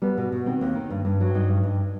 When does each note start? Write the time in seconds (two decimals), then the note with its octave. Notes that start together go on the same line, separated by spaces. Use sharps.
0.02 G3 B3
0.17 B2
0.32 B2
0.46 D#3 C4
0.61 D#2
0.75 D#3
0.90 G2
1.05 G2
1.20 F#3
1.34 G2 D#4
1.49 G2
1.63 G2